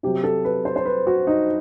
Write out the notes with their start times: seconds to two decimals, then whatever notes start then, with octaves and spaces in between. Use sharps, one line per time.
0.03 C3 F#3 G4
0.24 A4
0.45 B4
0.65 C5
0.76 C5
0.85 B4
1.07 F#4
1.27 D#4